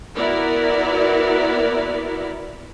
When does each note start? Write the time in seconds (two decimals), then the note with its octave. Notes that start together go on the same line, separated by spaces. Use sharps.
0.16 B3 E4 F#4 A#4 D5